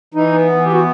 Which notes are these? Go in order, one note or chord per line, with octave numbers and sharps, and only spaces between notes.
E3 D#4
B3
E3
G4
B3 F#4